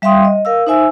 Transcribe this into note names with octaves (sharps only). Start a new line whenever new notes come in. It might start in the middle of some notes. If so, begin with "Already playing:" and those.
G3 E5 F5 G5 C6 D#6
D#5
A#4 F5 E6
D#4 C5 E5 G#5 E6